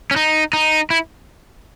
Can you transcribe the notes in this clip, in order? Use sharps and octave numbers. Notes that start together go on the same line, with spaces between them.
C#4
D#4
D#4
E4